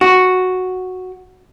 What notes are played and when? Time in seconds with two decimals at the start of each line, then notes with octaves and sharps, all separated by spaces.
0.01 F#4